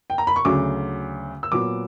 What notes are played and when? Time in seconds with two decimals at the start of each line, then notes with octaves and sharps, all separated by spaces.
0.10 G5
0.18 A#5
0.27 B5
0.36 C#6
0.45 D2 C#3 F#3 D6
1.43 E6
1.52 A#2 F#3 B3 D6